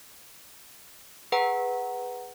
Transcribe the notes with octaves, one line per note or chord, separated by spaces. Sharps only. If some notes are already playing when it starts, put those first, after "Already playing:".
G#4 B4 F#5 A#5